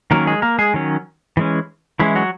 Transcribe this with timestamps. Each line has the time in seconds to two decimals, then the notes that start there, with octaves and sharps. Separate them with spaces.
0.11 D#3 F#3 A#3 C#4 A#4
0.27 G#3 G#4
0.42 A#3 A#4
0.59 G#3 G#4
0.74 D#3 F#3 C#4
1.37 E3 G#3 C#4
1.99 E3 G#3 C#4 E4
2.15 F#3 F#4